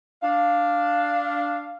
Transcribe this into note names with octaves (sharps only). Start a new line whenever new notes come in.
D4 F5